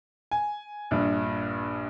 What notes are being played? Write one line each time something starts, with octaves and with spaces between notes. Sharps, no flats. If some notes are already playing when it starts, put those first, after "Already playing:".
G#5
A#1 G2